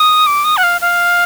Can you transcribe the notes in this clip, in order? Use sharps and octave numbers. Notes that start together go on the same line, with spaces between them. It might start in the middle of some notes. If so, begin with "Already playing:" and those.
Already playing: D#6
D6
D#6
F#5
F5
F5